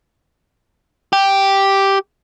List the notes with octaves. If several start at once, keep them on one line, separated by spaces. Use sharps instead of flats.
G4